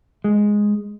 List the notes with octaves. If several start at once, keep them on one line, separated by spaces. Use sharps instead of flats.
G#3